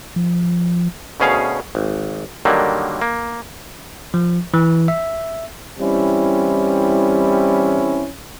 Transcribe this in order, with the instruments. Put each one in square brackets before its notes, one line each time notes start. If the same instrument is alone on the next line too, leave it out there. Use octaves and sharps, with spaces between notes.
[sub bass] F3
[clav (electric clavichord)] D2 B2 C#4 G#4 F5
G#1
D3 D#3 F#3 G3 A#3
A#3
[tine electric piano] F3
E3
E5
[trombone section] E3 G3 C4 C#4 E4